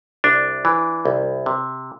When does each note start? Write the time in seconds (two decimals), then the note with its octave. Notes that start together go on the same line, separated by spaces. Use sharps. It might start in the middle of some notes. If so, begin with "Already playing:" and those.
0.24 C2 D4
0.65 E3
1.05 C2
1.46 C3